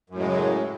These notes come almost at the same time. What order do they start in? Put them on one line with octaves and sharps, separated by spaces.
F#2 A2 G#3 C#3 F#3